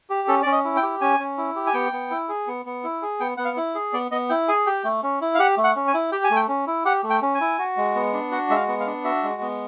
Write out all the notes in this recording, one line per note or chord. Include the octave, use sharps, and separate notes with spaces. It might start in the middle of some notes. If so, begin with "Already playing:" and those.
G4
C#4 A4
C#4 D5
D#5
E4
G5
G4
C#4 G#5
C#4
E4
G4
G#5
B3 G5
B3
E4
G#4
B3
B3
E4
G#4
B3 G5
B3 F#5
F5
E4
G#4
B3 D5
B3 D#5
E4 G5
G#4 G#5
G4 G5
A3
C#4
E4
F5
G4 F#5
A3
F#5
C#4
G#5
E4
G4 G5
G#5
A3
G5
C#4
E4
G4 F#5
A3
G5
C#4
G#5
E4
F#4
G#3
B3
D4
F#4 F#5
G#3 E5
F5
B3
F5
D4
F#4 E5
G#3
B3